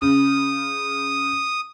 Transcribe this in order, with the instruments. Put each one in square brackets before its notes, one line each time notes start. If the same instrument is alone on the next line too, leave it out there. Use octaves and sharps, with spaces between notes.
[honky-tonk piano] C#3 [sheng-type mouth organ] D#6